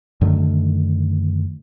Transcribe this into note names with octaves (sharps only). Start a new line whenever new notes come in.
F#2 D3 D#3 A3